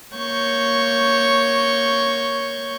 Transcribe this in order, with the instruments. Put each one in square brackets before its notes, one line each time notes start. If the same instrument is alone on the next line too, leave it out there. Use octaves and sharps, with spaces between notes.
[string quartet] A#3 C#5 C#6 G6